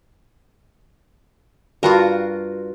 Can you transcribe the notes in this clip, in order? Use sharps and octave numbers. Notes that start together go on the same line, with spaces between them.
G2 F4 F#4 A#4